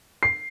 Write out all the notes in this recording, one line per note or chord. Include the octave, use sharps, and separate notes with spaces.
C7